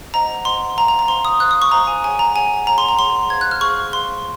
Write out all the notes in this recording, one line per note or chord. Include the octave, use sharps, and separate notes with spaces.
C5 D#5 F#5 A#5
C5 D#5 F#5 C6
C5 F5 A#5
A#5
A#5
C5 F5 C6
D#6
C5 F5 F#6
D#6
C#6
C5 F5 A#5
G#5
G#4 C#5 F#5 G#5
A#5
G#4 C#5 F#5 G#5
G#4 C#5 F#5 A#5
C6
A#5
G#4 C#5 F#5 C6
G#4 C5 F5 G#6
F#6
F6
G#4 C5 F5 C#6
G#4 C5 F5 C6